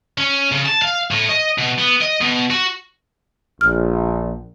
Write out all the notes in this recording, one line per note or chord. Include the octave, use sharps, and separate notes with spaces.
C#4
C#3
A5
F5
A2
D#5
B2
B3
D#5
B2
F#4
A#1 F6